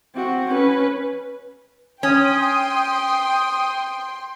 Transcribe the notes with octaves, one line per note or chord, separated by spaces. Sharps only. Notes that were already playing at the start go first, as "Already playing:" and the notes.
C4 F#4
C#4 B4
C#4 G5 C6 D#6